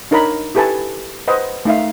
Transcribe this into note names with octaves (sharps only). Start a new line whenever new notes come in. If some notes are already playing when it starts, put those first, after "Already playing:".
D4 D#4 A#4 C#5 A#5 B5
E4 G4 A4 B4 G#5 A5
B4 C5 D#5 F#5
A3 D#4 E5 F5